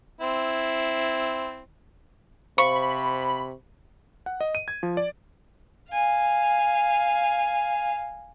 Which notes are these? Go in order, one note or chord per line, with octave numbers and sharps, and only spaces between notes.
C4 E4
C3 C5 F5 B5 C#6
F#5
D#5
D#7
G#6
F3
D5
F5 G#5